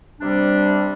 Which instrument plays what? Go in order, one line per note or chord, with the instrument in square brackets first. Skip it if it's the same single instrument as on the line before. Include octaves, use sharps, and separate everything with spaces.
[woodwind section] C3 G3 D4